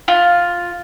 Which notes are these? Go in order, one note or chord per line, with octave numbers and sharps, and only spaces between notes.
F4